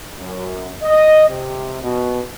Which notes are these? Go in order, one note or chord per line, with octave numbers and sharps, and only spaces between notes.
F#2
D#5
C3
B2